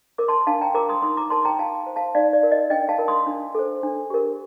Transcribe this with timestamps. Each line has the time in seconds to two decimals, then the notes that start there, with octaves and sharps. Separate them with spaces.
0.18 A#4 D6
0.28 A5 C6
0.47 D4 F5 A5
0.61 G5 A#5
0.74 F4 A#4 A#5 D6
0.89 C6 D#6
1.02 D#4 C6 D#6
1.17 A#5 D6
1.30 A#4 A5 C6
1.45 G5 A#5
1.59 F4 F5 A5
1.86 C5
1.96 F5 A5
2.15 D#4 D5 F5
2.33 D5
2.43 A#4
2.51 D#5
2.70 D4 D#5 G5
2.89 F5 A5
2.98 F4 A#4
3.08 C6 D#6
3.27 D4
3.55 A4 C5
3.83 D4
4.10 G4 A#4